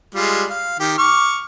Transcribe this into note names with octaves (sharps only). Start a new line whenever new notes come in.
G3 G#3 F4
F5
D#3 G4
C#6 D6 F6